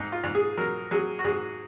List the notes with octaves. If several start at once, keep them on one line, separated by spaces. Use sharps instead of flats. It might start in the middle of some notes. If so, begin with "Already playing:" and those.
Already playing: G#2 D#4
F4
G#2
G#4
F#3 A#4
F#3 G#4
F#4
G#2 G#4